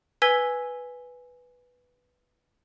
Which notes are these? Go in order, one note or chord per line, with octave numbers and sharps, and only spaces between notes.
B4 G#5 E6 G#6 B6 G7